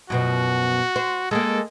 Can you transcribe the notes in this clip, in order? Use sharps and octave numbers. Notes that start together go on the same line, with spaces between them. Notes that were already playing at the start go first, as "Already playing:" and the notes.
F#2 B2 F3 F#4
C5
G#3 A#3 A4